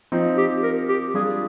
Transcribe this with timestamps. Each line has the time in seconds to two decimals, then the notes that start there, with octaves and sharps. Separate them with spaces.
0.12 F3 C4 D#4
0.38 G4
0.63 A#4
0.89 G4
1.14 G3 D4 F4 G#4